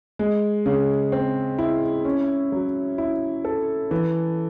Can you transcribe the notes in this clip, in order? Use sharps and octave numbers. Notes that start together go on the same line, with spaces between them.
G#3
C#3
C4
E4
C#4
F#3
E4
A4
E3